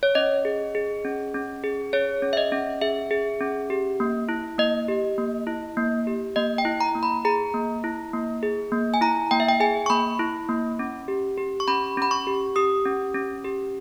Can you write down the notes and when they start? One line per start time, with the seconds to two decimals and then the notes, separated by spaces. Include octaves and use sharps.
0.03 C#5
0.15 C#4 D#5
0.45 G#4
0.75 G#4
1.05 C#4
1.34 C#4
1.64 G#4
1.93 G#4 C#5
2.22 C#4
2.33 E5
2.37 D#5
2.52 C#4
2.81 G#4 E5
3.11 G#4
3.41 C#4
3.70 G4
4.00 A#3
4.29 E4
4.58 A#3 D#5
4.88 G4
5.18 A#3
5.47 E4
5.77 A#3
6.07 G4
6.36 A#3 D#5
6.58 G5
6.65 E4
6.80 A#5
6.95 A#3
7.03 B5
7.25 G#4 A#5
7.54 A#3
7.84 E4
8.13 A#3
8.43 G#4
8.72 A#3
8.94 G#5
9.01 E4 A#5
9.31 A#3 G5
9.40 E5
9.49 G5
9.60 G#4 G#5
9.86 C#6
9.90 A#3 B5
10.19 E4
10.49 A#3
10.79 C#4
11.08 G4
11.38 G4
11.60 C#6
11.67 C#4 B5
11.97 C#4 B5
12.11 C#6
12.27 G4
12.56 G4 D#6
12.85 C#4
13.14 C#4
13.44 G4